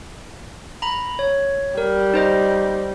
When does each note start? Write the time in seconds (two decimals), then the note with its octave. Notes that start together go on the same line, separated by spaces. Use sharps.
0.82 A#5 B5
1.19 C#5
1.78 G3 A#4
2.14 D#4 C5 D#5